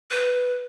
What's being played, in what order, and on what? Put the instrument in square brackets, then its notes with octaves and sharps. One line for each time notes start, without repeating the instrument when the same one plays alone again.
[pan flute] B4